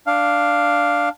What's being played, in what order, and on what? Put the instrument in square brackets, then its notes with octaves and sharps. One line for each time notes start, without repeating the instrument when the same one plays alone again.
[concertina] D4 F5